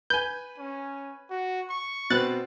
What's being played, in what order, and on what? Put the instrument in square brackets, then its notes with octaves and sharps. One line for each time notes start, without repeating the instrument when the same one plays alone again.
[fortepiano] B4 G#5 [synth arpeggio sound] G6
[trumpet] C#4
F#4
C#6
[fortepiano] B2 C4 B4 [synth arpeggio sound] F#6 A6